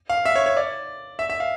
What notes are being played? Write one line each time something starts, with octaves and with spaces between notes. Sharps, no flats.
F5
E5
C#5
C#5
D5
E5
E5
F5